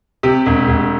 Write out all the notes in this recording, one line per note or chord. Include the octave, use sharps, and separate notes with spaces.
C3 G4
E1
E1